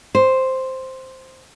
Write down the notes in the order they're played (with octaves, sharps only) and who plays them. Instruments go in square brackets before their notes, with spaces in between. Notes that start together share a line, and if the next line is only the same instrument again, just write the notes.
[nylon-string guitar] C5